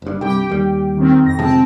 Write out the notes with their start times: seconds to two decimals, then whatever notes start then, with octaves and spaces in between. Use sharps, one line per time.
0.02 F#1 G2
0.21 C2 G2 G4 G5
0.49 D#2 G3
0.97 D#3 C4
1.24 F2 A#6
1.39 C3 F3 G#3 C4 G5 A5